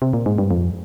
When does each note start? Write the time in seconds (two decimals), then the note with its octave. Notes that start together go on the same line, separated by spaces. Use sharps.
0.02 C3
0.13 A#2
0.26 G#2
0.38 G2
0.51 F2